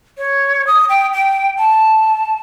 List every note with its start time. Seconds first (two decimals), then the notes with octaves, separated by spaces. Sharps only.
0.18 C#5
0.67 D#6
0.89 G5
1.13 G5
1.58 A5